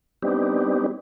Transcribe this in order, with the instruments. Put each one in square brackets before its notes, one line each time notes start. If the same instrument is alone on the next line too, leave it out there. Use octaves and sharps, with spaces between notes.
[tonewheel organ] G3 B3 C4 D4 D#4 G4